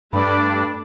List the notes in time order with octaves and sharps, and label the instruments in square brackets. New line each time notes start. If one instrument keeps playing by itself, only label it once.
[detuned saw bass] G2 [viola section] A3 D5 [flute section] D4 [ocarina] B5